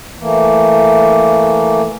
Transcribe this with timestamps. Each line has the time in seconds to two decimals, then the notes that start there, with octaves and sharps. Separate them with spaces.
0.20 E3 A3 A#3